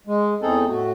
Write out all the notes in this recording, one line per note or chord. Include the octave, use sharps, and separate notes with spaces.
G#3
E2 C4 D#4 G#4 A4
A2 A3 F#4